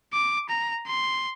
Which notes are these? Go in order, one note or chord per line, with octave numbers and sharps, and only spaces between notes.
D6
A#5
C6